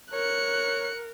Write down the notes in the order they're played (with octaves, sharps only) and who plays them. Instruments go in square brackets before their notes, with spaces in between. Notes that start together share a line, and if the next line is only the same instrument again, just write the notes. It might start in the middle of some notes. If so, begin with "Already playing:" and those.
[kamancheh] A#4 [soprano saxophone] C#5 [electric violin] F#6 C#7